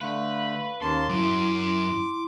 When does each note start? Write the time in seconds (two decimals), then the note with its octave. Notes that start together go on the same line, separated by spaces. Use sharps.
0.01 D3 A3 B4 F5
0.82 D#2 A#3 C#4 A5 C6
1.09 F#2 E4 D6